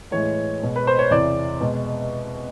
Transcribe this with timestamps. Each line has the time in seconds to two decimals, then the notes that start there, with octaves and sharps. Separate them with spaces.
0.11 A2 E3 G#3 C#5
0.61 B2 G#3
0.76 B4
0.87 C5
0.99 C#5
1.10 E2 C3 E3 D5
1.61 B2 G#3